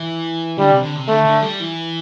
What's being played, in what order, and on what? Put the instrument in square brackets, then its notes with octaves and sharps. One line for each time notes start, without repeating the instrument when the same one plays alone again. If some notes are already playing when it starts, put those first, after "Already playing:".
Already playing: [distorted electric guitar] E3
[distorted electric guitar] D3 [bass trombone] G3
[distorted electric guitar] C3
D3
C3
[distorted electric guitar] D3 [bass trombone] A3
[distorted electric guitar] D3
G3
E3